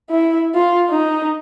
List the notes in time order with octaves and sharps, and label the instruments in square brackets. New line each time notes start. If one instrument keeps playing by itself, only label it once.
[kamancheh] E4
F4
D#4